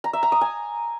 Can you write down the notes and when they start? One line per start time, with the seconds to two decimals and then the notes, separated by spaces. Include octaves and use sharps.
0.04 A#5
0.13 E5
0.23 A#5
0.32 D#6
0.41 G#5